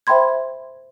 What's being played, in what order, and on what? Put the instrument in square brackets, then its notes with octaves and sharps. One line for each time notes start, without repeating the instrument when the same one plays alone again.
[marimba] C5 E5 G5 B5 C6 G#6